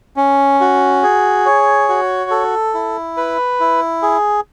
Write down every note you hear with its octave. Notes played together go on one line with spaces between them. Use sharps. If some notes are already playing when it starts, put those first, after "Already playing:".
C#4
F#4
G#4
C#5
F#4
A4
E4
B4
E4
G#4